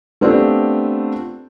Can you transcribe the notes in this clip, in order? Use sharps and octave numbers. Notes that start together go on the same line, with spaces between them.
A3 B3 C4 D4 F4 G4